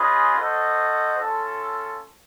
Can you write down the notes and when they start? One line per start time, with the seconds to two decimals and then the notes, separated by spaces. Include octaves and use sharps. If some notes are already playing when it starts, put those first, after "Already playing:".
Already playing: C#4 F4 G#4 B4 D#5
0.35 F#4 A4 C5 D#5
1.18 C#4 F4 A4